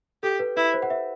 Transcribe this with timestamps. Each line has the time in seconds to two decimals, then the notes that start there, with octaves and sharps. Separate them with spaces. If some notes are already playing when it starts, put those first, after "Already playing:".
0.23 G4 A4
0.39 B4
0.56 E4 B4
0.74 C5
0.83 F#5
0.90 E5